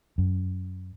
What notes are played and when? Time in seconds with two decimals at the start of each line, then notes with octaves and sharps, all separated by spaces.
0.18 F#2